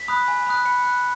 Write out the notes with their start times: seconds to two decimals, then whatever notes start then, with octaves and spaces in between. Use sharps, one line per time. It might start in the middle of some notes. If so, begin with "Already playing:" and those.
Already playing: B6
0.08 B5 D#6 F#6
0.28 G#5
0.46 B5 D#6 F#6
0.65 B5 C#7
0.85 F#6